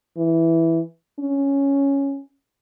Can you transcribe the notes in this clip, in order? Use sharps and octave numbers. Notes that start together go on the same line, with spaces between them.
E3
C#4